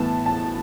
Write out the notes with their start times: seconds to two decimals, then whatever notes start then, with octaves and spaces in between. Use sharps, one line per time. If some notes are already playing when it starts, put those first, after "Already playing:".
Already playing: A2 E3 B3 A5
0.26 A5